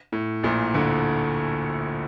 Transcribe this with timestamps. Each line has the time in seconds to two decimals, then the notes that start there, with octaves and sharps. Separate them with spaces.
0.12 A2
0.43 A#1 A#2
0.74 D2 D3